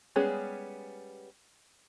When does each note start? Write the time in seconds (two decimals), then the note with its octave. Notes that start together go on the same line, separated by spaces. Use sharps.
0.16 G3 G#3 B3 C#4 G#4